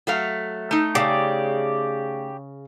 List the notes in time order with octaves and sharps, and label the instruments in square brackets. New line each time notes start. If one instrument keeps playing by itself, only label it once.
[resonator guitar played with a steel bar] F#3 A3 F5
A3 D#4
[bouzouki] C#3 [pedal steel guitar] G4 D5